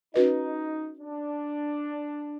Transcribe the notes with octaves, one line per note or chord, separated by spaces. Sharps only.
C#4 D#4 F#4 B4 D#5
D4